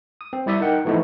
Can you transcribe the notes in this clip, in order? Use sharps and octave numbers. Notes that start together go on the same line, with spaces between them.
D#6
C4
G3 E4 D5 E5 D#6
D#4 A#4 F#5 G5
E3 F3 A3 B3 D#4 E4